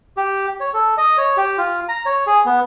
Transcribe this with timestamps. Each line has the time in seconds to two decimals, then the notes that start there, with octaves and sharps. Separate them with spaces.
0.17 G4
0.60 C#5
0.74 A4
0.97 D#5
1.18 C#5
1.37 G4
1.58 F4
1.89 A#5
2.06 C#5
2.27 G#4
2.46 B3